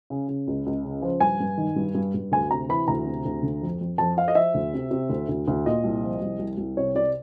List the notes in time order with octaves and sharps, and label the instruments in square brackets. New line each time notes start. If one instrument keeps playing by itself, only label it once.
[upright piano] C#3
C#3
C#2
C#2
C#3
F3
G2 G#5
G2
D#3
G2
G2
G2
D2 G#5
C3 A#5
E3 B5
D2 A#5
C3
D2
D3
F2
F2
F2 A5
F3 F5
D#5
F3 E5
D2
C3
C3
D2
D2
D2
A#2 D#5
C2
F3
C2
C2
C2
C3 C#5
C3 D5